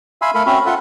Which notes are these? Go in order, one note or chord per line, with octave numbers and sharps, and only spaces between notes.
E5 F5 G#5 B5 C6 E6
A3 A4 A#4 F5 B5
C4 C#4 F#4 E5 B5
F4 A4 E5 F#5